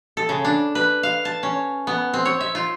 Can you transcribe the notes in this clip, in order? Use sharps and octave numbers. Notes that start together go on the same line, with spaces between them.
A4
C#3
D4
B4
F5
A5
C#4
B3
C4
C#5
E5
F4